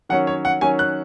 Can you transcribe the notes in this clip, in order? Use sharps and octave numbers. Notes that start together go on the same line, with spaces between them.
D#3 F#3 C#4 F#5
C#5
F#5
D#3 F#3 C#4 G#5
F#6